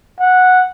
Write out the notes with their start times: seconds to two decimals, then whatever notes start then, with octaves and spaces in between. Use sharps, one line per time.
0.20 F#5